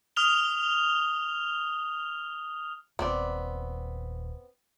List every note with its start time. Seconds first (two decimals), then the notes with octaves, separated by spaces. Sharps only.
0.16 D#6 F6 F7 G7
2.99 D#1 B3 C4 D5